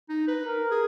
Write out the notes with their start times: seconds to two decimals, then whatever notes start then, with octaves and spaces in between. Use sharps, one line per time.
0.09 D#4
0.28 B4
0.46 A#4
0.71 G#4